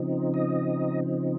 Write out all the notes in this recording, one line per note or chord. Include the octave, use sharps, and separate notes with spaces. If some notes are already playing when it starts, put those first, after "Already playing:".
Already playing: C#3 F3 C4 D#4
D#5